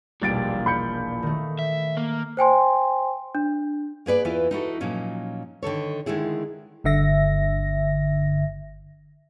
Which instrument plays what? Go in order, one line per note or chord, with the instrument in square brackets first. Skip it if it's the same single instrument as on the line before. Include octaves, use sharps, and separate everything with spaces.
[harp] E1 A#1 D6 [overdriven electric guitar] A#2 [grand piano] G3 A6 D7
[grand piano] B5 G6 C#7
[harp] D#3 A3
[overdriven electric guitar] E5
A#3
[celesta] C5 G5 G#5 C6
D4
[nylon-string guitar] A#3 G#4 B4 D5
E2 E3 E4 F4 B4
D#4 E4 F#4 A4
A#2 F3 F#3 C#4 D#4
D3 D#3 A4 C#5
D3 D#3 G#3 E4 G#4
[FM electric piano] G1 G2 D3 E5 A#6